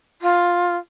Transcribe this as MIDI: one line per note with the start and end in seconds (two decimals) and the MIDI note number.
0.22 0.77 65